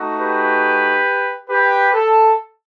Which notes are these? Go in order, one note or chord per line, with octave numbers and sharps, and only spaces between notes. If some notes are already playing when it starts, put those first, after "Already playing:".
Already playing: A3 D#4 F#4
G4 B4
G4 B4
A4